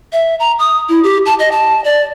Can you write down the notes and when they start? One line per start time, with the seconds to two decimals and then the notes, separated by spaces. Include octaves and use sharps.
0.13 E5
0.40 A#5
0.59 D#6
0.89 E4
1.04 G4
1.26 A5
1.39 D#5
1.52 A5
1.84 D5